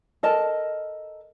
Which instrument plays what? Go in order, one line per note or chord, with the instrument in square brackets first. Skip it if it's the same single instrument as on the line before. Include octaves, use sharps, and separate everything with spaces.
[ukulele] A4 A#4 D#5 A5